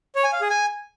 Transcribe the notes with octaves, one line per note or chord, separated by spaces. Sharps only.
C#5
G#5
F5
G#4
G#5